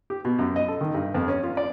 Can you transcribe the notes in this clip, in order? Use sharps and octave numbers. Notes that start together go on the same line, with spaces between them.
G4
B2
F#2
D#5
A4
D#3
G2
F2
C#4
F4
D5